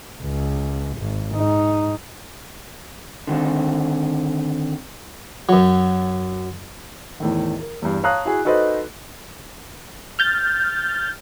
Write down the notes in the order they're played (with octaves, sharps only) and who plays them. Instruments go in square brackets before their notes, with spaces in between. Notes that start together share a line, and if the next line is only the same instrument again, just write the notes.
[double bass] C#2
G#1
G#2 D#4
[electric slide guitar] D3 D#3 C4
[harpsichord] F#2 F#3
[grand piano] E2 A2 D#3
A#4
E2 G2
C#5 F5 A5 A#5 D#6 F#6
E4 F#4 G#4
D#4 F#4 A4 B4 C5 D#5
[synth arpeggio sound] F6 G6 A6